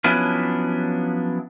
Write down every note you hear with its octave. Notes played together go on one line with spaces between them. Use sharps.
F3 F#3 B3 C#4 D4 E4